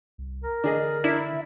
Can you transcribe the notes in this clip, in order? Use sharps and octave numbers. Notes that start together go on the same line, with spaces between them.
C2
A#4
D3 D4 G#4 D#5
D4 E4